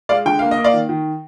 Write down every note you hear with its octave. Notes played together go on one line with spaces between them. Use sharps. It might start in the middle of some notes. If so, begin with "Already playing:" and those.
G#3 D5 F5
D3 G5
A#3 F5
D#5
A#3
D5 F5
D#3
D#3